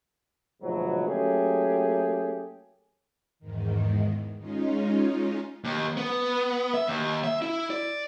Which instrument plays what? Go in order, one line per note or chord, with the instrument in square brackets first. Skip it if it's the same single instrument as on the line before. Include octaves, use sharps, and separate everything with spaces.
[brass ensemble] D2 G#2 B2 F3 F#3
F#3 A3 A#3 C#4 G4 G#4
[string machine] E2 G#2 D#3
G#3 C#4 D#4 F4
[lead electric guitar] D#2
B3
E5
D#2
E5
E4
D5